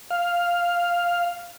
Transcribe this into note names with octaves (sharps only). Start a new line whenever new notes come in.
F5